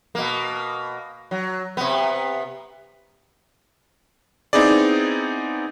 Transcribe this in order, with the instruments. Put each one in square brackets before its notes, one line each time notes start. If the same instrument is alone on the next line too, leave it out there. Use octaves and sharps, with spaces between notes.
[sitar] B2 A#3
F#3
C3 B3
[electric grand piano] B3 C4 D#4 E4 G#4 D5